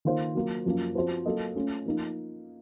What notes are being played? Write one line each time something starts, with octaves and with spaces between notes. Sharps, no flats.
D#3 A#3 F4 C5
F#3 A#3 F4
F#2 F3 A#3
F3 C4 F#4 C5
F#3 A#3 F4 A4 D#5
A3 C#4 F4
F3 A#3 D#4